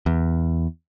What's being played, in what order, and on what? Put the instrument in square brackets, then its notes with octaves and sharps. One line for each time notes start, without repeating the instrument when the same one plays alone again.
[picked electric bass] E2